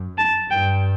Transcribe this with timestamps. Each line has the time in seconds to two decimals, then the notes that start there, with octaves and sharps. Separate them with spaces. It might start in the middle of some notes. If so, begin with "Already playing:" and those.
Already playing: F#2
0.18 A5
0.50 G2 G5